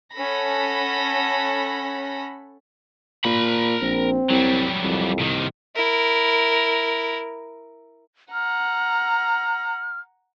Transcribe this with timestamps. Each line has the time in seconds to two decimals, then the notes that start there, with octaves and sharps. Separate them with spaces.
0.15 C#4 A4 F#5 B5 A#6
3.25 A#2 A#4 B5
3.82 A#1 C4
4.30 C2 F#3 G3
4.83 C2 F2
5.19 C3 D#3
5.76 E4 A#4
8.33 F#5 A#5 F6